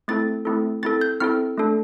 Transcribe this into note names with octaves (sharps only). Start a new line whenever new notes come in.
A3 C4 E4 A4 A6
A3 C4 E4 A4
C4 E4 A4 A6
G6
C4 E4 A4 F6
A3 D4 A4